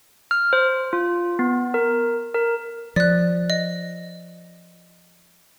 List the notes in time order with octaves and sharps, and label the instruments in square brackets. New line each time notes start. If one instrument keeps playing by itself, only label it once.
[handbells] F6
C5
F4
B3
A#4
A#4
[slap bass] F3 [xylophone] D5 F#6
[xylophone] D#5